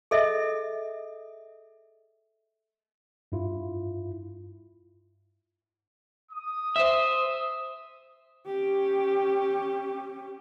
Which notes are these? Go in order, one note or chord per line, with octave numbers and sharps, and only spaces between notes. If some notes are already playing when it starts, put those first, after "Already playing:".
G#4 A4 D#5 E5
G2 E4 F4
D#6
C5 E5
C#4 G4